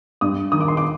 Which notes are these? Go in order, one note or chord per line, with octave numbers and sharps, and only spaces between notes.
G2 D#6
D#3 D#6
D6
C6
D6